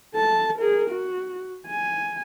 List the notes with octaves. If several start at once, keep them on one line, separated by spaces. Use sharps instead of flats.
A4 A5
G#4 A#4
F#4
G#5